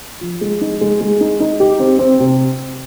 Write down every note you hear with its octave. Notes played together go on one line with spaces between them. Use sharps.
F3
G#3
D#4
G#3
G#3
D#4
D#4
G4
C4
C4
C3